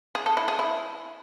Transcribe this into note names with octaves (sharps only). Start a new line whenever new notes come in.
G#4
A4
E4
G#4
E4